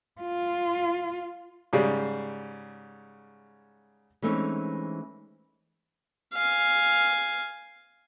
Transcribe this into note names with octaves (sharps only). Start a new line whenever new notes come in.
F4
G#2 C#3 G3
E3 G#3 A3 C4 C#4 D#4
F5 G#5